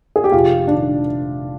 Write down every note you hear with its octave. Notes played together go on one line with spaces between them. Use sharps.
G#4
G4
F1 F4
D#3 D4